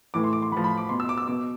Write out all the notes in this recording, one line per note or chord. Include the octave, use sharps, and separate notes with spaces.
A2 E3 D6
C6
D6
C6
A2 F3 B5
B5
D6
B2 C6
E6
D6
E6
B2 D6